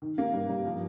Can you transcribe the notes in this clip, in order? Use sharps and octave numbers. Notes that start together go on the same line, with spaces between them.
D#3
A#3
G2
G2
F3